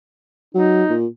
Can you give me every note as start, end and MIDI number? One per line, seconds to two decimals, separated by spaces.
0.55 0.84 54
0.55 0.94 63
0.89 1.06 46